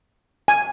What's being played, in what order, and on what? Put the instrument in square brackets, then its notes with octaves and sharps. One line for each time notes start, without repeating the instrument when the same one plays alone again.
[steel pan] G#5